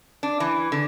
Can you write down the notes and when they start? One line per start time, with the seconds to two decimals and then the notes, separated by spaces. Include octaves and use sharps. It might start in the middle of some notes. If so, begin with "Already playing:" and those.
0.23 D4
0.40 E3
0.72 D3